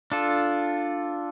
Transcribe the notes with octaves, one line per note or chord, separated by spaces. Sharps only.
D4 F4 A4